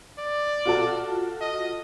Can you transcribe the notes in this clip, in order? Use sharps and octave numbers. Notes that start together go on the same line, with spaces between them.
D5
F4 F#4 A4
D#5